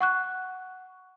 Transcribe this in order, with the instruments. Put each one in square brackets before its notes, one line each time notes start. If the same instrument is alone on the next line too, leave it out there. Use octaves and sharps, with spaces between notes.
[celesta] F#5 C#6 F#6